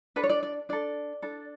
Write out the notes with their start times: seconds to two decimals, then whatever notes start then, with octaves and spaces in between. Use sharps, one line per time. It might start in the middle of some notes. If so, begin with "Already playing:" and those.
0.16 D4 A4 B4
0.24 C#5
0.29 D5
0.43 D5
0.69 D4 A4 D5
1.22 D4 A4